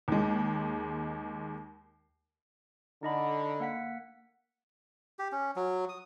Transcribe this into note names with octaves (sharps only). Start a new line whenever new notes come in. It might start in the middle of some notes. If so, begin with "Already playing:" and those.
D#2 G#3
D3 D#4 D#5 B5
A#3 F#5 B6
G4
C#4
F#3
D#6